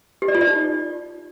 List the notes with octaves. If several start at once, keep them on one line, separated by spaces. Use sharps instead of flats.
G4
D5
F4
D5
D#4